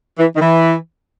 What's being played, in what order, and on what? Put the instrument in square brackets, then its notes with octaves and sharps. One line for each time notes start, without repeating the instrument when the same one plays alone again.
[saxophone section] E3
D#3
E3